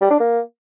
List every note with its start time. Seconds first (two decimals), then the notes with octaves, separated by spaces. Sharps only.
0.01 G3
0.10 D4
0.20 A#3